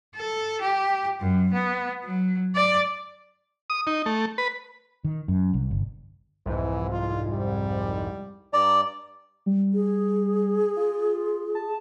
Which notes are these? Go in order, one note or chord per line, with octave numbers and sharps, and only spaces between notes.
A4
G4
F#2
B3
F#3
D5
D#6
D#4
A3
B4
D#3
F#2
C2
G1
C2 F2 G#2 E3
F4
G3
G2 D5 A#5
G3
G#4
F4
A5